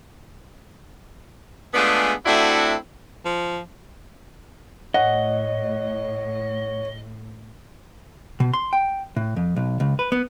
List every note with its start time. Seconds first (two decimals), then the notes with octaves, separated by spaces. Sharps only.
1.74 G#3 A3 B3 D4 F4 G#4
2.26 A3 C4 D4 E4 F#4
3.25 F3
4.94 A2 C#5 D#5 F#5
8.40 B2
8.54 C6
8.73 G5
9.16 A2
9.36 F2
9.56 B1
9.80 C#2
9.99 B4
10.12 B3